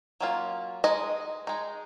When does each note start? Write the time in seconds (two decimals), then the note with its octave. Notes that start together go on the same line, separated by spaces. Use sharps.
0.20 F#3 A#3 C#4 F4
0.84 G#3 D#4 D#5
1.47 G#3 D#4